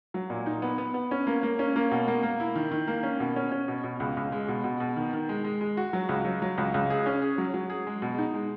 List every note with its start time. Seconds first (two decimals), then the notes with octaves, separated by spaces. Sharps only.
0.14 F#3
0.30 A#2
0.46 D#4
0.62 B3
0.78 B3
0.94 B3
1.11 C#4
1.27 A#3
1.43 A#3
1.59 C#4
1.76 A#3
1.91 B2
2.08 A#3
2.23 A#3
2.40 E4
2.55 D#3
2.71 D#3
2.88 A#3
3.03 C#4
3.20 B2
3.36 C#4
3.51 C#4
3.68 B2
3.84 B2
4.00 C#2
4.17 C#2
4.32 G#3
4.48 B2
4.64 B2
4.80 B2
4.96 D#3
5.13 D#3
5.29 G#3
5.44 G#3
5.61 G#3
5.77 F#4
5.93 F#3
6.09 C#2
6.25 F#3
6.42 F#3
6.58 C#2
6.74 C#2
6.90 G#4
7.06 C#4
7.22 G#4
7.38 F#3
7.54 F#3
7.70 G#4
7.87 G#3
8.02 B2
8.18 D#4
8.34 G#3